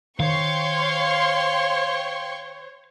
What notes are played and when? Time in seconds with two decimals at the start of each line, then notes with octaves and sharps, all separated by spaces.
0.20 D#3 C5 C#5 F5 G5 C6 C#6